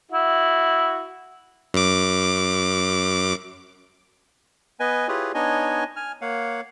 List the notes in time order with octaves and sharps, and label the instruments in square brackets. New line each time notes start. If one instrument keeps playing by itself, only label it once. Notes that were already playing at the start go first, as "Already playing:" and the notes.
[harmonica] E4 F#4
[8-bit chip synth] F#2 D6
[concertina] B3 B4 D#5 G#5
E4 F4 G4 G#4 B4 C#5
B3 D4 D#4 C#5 D#5 G#5
G#5 F6
A#3 C#5 F5 F#5